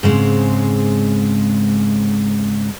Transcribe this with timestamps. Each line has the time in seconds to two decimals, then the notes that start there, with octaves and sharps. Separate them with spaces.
0.03 G#2 C#3 G#3 C4